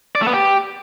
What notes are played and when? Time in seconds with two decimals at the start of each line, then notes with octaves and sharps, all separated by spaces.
0.15 D5
0.21 A3
0.27 B3
0.33 G4